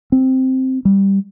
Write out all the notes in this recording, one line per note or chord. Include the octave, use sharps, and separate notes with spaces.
C4
G3